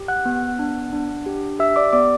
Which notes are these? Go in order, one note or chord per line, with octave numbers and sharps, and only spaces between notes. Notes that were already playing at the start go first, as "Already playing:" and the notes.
Already playing: G4
F#5 F#6
B3
D4
D4
G4
G4 E5 E6
D5 D6
B3 D5 D6